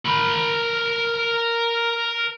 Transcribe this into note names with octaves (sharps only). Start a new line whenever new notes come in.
A#4 B5